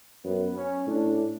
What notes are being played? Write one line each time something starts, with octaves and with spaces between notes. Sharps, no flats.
F#2 B3
C#4
A2 D4